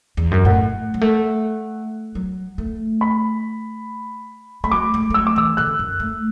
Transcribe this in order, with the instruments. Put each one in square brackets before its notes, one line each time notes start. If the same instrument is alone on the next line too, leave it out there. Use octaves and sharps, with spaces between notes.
[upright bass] E2
F#2
[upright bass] A2 [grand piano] F#5
[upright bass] F#3
A3
F#3
A3
[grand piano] B5
[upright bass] A3 [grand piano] B5
[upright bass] F#3 [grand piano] D6
[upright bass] A3
A3
[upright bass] F#3 [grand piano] E6
[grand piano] D6
[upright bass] E3 [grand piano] E6
[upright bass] D3 [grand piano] F#6
[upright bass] F#2
A3